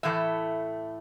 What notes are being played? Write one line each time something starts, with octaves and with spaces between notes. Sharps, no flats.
A2 E3 A3 E5